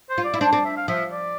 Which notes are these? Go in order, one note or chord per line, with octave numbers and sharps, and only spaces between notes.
C5
F4
D5
E4
D4 C5
C4 D5
E5
F5
F3 E5
D5